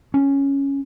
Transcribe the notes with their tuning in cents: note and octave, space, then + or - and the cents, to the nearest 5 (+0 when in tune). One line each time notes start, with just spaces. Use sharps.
C#4 +0